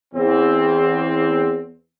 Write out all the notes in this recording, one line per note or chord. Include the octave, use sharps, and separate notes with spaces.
E2 C4